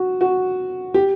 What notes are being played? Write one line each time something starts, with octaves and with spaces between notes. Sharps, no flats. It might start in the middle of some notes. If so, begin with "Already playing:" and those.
Already playing: F#4
F#4
G4